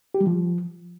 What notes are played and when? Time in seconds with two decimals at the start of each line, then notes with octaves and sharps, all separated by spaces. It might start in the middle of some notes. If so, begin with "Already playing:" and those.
0.14 G4
0.21 G3
0.27 F3